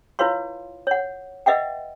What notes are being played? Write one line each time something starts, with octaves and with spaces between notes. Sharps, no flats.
E4 F4 B4 C#5 F5 C6
C#5 F#5
B4 D#5 E5 F#5 G5